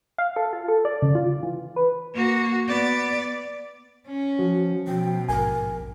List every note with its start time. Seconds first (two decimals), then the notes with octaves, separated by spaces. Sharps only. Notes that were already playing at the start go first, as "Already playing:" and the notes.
0.18 F5
0.36 A4
0.53 F4
0.68 A4
0.85 D5
1.02 C#3
1.15 F4
1.43 E3
1.76 B4
2.14 A#3 F#4
2.68 B3 D5
4.07 C#4
4.39 F3 F#4
4.87 B2 F3 G5
5.29 A#1 G#2 A#4 G#5